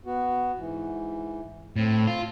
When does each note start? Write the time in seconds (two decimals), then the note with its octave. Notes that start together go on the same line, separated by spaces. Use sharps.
0.06 B3 F#4
0.56 G#2 E3
1.76 A2 C4
2.07 F4